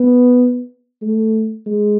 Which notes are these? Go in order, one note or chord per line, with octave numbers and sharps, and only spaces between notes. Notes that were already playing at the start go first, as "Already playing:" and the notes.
Already playing: B3
A3
G#3